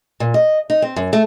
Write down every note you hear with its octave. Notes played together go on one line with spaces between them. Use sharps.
A#2
D#5
D#4
C4
F#2
A3